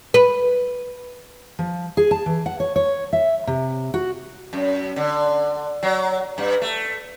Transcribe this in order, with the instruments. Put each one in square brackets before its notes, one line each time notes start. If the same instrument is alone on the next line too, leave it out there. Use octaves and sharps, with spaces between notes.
[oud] B4
[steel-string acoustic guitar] F3
G#4
A5
E3
F#5
C#5
C#5
E5
C3
F#4
[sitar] F#2
D3
F#3
G2
A3